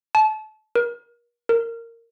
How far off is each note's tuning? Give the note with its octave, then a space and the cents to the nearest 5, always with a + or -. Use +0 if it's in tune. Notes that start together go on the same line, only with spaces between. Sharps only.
A5 -30
A#4 +35
A#4 -15